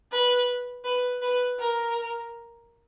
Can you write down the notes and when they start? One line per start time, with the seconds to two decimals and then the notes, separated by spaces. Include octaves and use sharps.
0.11 B4
0.84 B4
1.21 B4
1.59 A#4